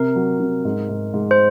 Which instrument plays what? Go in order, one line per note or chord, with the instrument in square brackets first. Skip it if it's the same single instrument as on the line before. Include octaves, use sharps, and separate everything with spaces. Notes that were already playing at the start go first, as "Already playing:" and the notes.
Already playing: [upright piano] C3 [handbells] A#4
[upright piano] F#3
C3
G#2
G#2
G#2
[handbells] C5